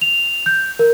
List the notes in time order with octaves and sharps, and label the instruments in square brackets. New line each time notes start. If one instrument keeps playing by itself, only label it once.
[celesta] F7
G6
A#4